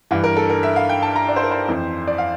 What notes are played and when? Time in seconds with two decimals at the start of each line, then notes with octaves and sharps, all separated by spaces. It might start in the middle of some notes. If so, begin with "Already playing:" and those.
0.11 G2 E3
0.24 A#4
0.36 A4
0.49 A#4
0.63 E5
0.76 F5
0.89 G5
1.03 A5
1.16 A#5
1.29 D5
1.36 C5
1.43 A#4
1.51 C5
1.68 F2 E3
2.07 D5
2.18 F5